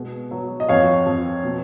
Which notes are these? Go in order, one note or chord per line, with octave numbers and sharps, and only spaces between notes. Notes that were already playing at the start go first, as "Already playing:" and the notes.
Already playing: B2 G#3
F#3
D#5
F2 C#5 F5
F2
B2